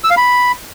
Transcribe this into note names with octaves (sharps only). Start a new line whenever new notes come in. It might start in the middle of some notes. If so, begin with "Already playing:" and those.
E6
F5
B5